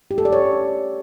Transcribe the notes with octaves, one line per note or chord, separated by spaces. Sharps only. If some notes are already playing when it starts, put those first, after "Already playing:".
G4
A4
D5
C#5